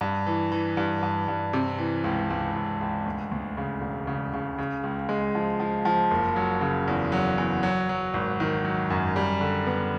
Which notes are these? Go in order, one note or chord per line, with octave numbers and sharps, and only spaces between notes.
G2
E3
E3
G2
G2
G2
C3
E3
C#2
C#2
C#2
C#2
D2
D2
C#3
E1
C#3
C#3
C#3
C#2
G#3
F3
F3
F3
F#1
F#3
C#3
E2
F#3
E2
F#3
F#3
G#1
D#3
F#3
F#2
G3
D3
B3